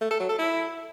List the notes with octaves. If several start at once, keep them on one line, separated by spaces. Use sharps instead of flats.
A3
A4
F#3
A4
E4